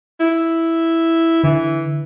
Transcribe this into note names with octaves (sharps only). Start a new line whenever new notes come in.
E4
D3 E3